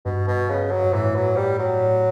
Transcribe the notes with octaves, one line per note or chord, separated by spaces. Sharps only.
G2 B2
B2
C#3
F#3
G2
A2 E3
F#3
G3
F#3
A2